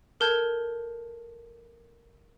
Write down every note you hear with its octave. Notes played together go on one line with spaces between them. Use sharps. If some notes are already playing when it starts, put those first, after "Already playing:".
A4 A#4 A5 G6 G#6